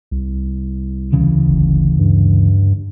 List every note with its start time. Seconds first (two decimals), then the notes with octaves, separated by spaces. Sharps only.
0.11 C2
1.12 D2 C#3 E3
1.48 G1
1.99 G2